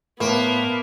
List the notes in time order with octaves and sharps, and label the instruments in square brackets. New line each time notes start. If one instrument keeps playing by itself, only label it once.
[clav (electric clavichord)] A2 [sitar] A#3 [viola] B3 [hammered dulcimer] C5 A5